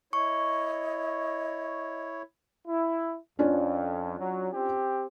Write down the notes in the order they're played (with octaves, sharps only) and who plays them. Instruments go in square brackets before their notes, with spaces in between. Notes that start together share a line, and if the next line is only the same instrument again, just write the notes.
[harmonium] E4 C#5 [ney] D#5 [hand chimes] C#6
[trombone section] E4
[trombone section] F2 [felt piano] C#4 D4 F4
[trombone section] F#3
C4 G4